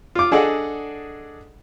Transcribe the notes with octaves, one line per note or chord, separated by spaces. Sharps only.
F4 D6
D4 G#4 A4 D5 D#5 F#5